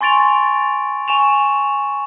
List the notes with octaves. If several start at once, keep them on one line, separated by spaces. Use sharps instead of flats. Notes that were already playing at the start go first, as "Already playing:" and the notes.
G#5 C6 C#6 A6 D7 F7
G#5 C#6 E7 F7